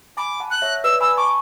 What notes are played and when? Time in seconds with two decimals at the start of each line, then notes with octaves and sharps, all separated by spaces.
0.17 G#5 B5 D6
0.40 F#5 A5
0.50 F#6
0.62 C#5 E5
0.84 B4 D5 E6
1.00 G#5 B5 E6
1.17 A5 C#6 D6